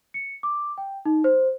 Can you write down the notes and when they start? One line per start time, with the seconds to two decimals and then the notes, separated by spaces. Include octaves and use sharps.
0.14 C#7
0.43 D6
0.78 G5
1.06 D#4
1.24 C5